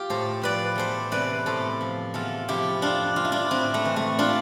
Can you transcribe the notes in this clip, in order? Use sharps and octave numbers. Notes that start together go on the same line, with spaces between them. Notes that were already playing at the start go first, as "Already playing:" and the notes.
Already playing: F4 G4
A2 A4 C5
F3 B4 D5
E2 A4 C5
C3 E3 B4 D5
A2 A4 C5
F3
E2 F4 A4
C3 F3 E4 G4
F2 D4 F4
E3 F4
E4
D4 F4
A2 C4 E4
A3
E3
A3
D4 F4